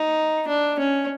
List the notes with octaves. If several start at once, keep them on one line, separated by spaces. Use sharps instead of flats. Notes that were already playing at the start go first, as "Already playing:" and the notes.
Already playing: D#4
D4
C#4